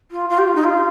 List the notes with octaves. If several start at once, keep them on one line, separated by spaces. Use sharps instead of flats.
F4
F4
G4
F4
D#4
F4